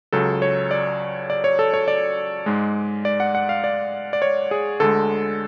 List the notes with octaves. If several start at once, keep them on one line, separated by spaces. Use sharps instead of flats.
C#2 C#3 F#3 A4
C#5
D5
D5
C#5
A4
C#5
D5
G#2 G#3
D5
F#5
F#5
F5
D5
D5
C#5
G#4
D2 D3 G#3 A4